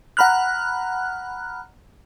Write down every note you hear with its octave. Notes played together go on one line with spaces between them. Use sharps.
F#5 A#5 B5 F6 F#6